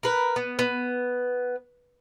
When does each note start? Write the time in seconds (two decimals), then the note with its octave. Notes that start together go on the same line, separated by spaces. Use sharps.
0.03 A#4 B4
0.36 B3
0.59 B3